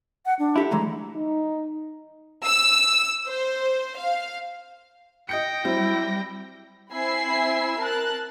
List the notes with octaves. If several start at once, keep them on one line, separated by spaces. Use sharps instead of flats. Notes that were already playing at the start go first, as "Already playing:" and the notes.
F#5
D4
E4 G4 A4
E3 G#3 A3 A#5
D#4
E6
C5
F5
D#5 G5 G6 A#6 C#7
F#3 G3 C4 E4
C4 E4 G#5 B5 E6 C7
A#4 A5 F#6